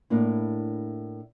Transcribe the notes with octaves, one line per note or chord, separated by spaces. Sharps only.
A2 A#3 D4 E4